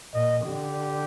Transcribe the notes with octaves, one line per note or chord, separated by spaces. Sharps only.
A#2 D#5
D3 G4